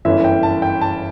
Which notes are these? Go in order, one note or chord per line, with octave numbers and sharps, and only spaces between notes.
G1 F#2 E3 E5
G5
A5
G5
A5